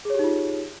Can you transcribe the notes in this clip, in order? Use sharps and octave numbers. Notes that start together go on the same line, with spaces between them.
D#4 F4 G4 G#4 C#5